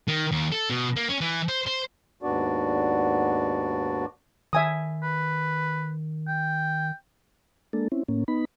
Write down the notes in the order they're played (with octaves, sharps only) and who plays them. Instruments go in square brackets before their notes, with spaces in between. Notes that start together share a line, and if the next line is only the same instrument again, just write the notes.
[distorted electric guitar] D#3
D#2
A4
B2
A#3
C#4
E3
C5
C5
[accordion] D#2 G#2 B3 D4 F#4 D5
[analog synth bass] D#3 [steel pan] E5 G#5 D#6
[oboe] B4
G5
[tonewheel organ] G#3 A#3 D4 A4
C4 C#4 E4
A2 A#3 C#4
B3 D#4 B5